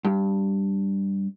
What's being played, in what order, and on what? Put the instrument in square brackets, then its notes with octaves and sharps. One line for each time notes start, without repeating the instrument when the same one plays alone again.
[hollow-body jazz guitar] G2